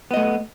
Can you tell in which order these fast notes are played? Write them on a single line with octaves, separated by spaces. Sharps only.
B3 D#5 A3